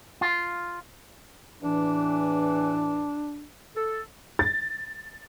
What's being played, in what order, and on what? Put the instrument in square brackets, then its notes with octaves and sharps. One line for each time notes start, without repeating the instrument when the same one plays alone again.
[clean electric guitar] F4
[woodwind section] E2 A2 E3 [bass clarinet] D4
[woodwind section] A4
[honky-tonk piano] A6